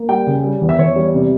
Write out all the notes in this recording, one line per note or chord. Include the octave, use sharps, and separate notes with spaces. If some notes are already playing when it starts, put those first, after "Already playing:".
Already playing: A#3
G3 G5
C#3
G3
E2
E5
E2 C#5
G3
C3